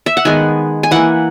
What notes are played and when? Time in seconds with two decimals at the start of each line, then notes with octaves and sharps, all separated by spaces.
0.06 E5
0.17 F#5
0.25 D#3 G#3 B3 G#5
0.83 G#5
0.91 E3 A#3 F#5